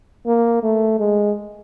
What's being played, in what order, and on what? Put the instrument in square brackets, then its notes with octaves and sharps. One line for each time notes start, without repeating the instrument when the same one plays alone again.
[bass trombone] A#3
A3
G#3